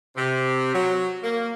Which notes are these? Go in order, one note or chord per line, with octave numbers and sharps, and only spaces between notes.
C3
F#3
A#3